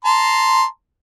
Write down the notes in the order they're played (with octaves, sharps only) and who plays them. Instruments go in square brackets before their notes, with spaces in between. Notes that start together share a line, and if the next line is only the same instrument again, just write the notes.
[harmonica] A5 A#5 C6